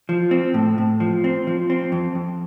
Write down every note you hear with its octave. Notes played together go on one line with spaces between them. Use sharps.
F3
C4
A2
A2
F3
C4
F3
C4
F2
F2